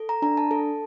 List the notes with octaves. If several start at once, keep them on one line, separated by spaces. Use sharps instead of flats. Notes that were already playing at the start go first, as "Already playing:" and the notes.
Already playing: A4
A#5
D4 A#5
A5
A4